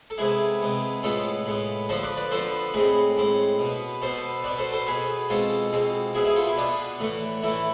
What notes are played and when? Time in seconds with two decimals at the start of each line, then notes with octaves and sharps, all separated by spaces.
0.10 A4
0.18 C3 G#3 B3 E4 G#4
0.62 C3 G#3 B3
1.03 A2 G#3 B3 F4 A4
1.46 A2 G#3 B3
1.89 D3 F3 B3 A4 C5
2.03 B4 D5
2.17 B4 D5
2.31 D3 F3 B3 A4 C5
2.74 A2 G#3 C4 G#4 B4
3.17 A2 G#3 C4
3.59 B2 B3
4.02 B2 B3 A4 C5
4.44 B2 B3 B4 D5
4.58 A4 C5
4.72 A4 C5
4.86 B2 B3 G#4 B4
5.29 B2 G#3 C4 F4 A4
5.73 B2 G#3 C4
6.14 B2 B3 E4 G#4
6.25 E4 G#4
6.36 F4 A4
6.47 E4
6.57 B2 B3 D4
7.00 A2 E3 A3
7.43 A2 E3 A3 E4